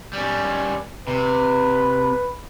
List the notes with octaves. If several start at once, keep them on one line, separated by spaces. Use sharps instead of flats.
G3 C#4
C3 B4